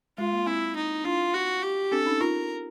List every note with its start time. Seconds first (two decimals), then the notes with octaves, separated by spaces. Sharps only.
0.18 G#3 F4
0.33 A#3
0.46 C4 E4
0.76 D#4
1.04 D4 E4 F4
1.34 F#4
1.63 G4
1.92 C4 D4 A4
2.06 C#4 D#4
2.21 D#4 F4 A#4